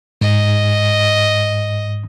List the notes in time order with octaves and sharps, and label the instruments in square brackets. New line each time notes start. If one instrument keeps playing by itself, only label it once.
[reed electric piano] G#2 [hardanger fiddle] D#5